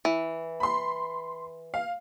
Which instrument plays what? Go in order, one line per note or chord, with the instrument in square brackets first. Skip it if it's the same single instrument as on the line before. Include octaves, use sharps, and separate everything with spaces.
[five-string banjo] E3
[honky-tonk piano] B5 C6
F5